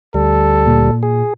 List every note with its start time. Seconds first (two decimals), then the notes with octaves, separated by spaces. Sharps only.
0.14 D2 G3 A4
0.66 A#2
1.03 G#4